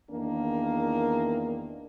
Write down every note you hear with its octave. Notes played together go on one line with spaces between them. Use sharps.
E2 D#3 A#3 D4 A#4